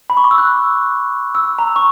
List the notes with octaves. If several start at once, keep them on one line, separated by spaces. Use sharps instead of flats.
B5
C#6
D6
E6
F#6
E6
A#5
C#6